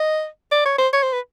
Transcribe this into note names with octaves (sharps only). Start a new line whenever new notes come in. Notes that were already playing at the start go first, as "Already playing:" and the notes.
Already playing: D#5
D5
C#5
C5
C#5
C5
B4